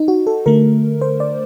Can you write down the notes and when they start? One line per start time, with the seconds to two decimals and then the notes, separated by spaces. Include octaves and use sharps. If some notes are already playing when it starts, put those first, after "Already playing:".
Already playing: D#4
0.08 F#4
0.27 A4
0.46 D3 A3 A#4
1.01 C5
1.20 D5